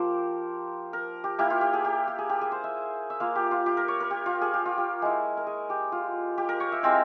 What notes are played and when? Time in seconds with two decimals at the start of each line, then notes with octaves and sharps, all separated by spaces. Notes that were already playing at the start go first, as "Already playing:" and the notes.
Already playing: F3 A#3 F4 G4 A#4 C5
0.93 A#4
1.24 G4
1.39 A#3 E4 G4
1.50 F4
1.61 G4
1.73 G#4
1.84 G4
2.07 G4
2.18 G#4
2.29 G4
2.41 G#4
2.52 C5
2.64 E5
3.10 E5
3.20 A#3 F4 F5
3.35 G4
3.51 F4
3.66 G4
3.77 A#4
3.88 C#5
4.00 A#4
4.11 G4
4.26 F4
4.41 G#4
4.54 G4
4.66 F4
4.78 G4
5.02 G#3 E4
5.37 A#4
5.47 G#4
5.70 G4
5.92 F4
6.38 G4
6.49 A#4
6.60 C#5
6.72 E5
6.83 G#3 C4 E4 F5